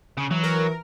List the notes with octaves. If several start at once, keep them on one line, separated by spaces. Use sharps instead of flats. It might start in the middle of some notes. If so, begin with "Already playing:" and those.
C#3
E3 F#3
A#4